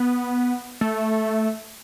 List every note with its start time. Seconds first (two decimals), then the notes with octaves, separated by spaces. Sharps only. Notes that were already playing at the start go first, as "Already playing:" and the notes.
Already playing: B3
0.81 A3